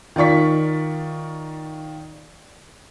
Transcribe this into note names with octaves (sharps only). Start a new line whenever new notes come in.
D#3 F4 D5 C#6 B6